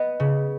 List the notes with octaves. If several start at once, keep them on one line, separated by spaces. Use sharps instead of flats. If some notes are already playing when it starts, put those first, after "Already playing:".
Already playing: B3 D#5
C#3